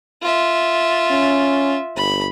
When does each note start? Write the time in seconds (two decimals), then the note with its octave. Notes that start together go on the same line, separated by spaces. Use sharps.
0.22 F4 E5
1.11 C#4
1.97 G1 B5